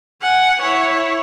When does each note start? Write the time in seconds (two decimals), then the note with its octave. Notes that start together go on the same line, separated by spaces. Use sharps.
0.22 F#5 G#5
0.61 E4 C#5